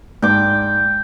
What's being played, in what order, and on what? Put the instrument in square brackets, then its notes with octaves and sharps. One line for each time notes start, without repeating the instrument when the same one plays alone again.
[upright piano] G#2 [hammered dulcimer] G5 D6